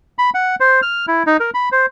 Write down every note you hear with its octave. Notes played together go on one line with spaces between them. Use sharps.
B5
F#5
C5
F6
E4
D#4
A#4
B5
C5